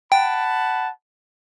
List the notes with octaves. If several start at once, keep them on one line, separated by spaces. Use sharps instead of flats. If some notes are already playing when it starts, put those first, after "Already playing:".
F#5 G5 A5 B5